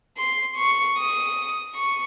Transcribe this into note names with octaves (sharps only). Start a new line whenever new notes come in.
C6
C#6
D#6
C#6